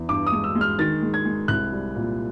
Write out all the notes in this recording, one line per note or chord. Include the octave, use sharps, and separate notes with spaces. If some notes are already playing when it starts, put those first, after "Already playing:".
Already playing: E2
G2 D6
D#6
G#3
E6
G#3
F6
D#3 A6
G#3
G#6
G#3
C2 F#6
G3
A#2